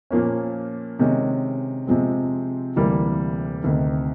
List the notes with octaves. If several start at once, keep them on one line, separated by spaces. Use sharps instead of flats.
A#2 F3 A#3 C#4
C3 D#3 G#3 C#4
C3 F3 G#3 C4
D2 C3 E3 G3 A#3
D2 C3 D#3